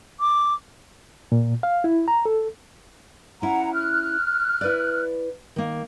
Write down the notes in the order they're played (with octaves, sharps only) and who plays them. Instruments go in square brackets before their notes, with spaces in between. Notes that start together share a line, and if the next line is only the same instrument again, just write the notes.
[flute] D6
[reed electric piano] A#2
F5
E4
A#5
A4
[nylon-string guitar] C#4 E4 [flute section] F#5 A#5
[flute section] F6 F#6
[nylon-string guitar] E4 B4 D5
D#3 A#3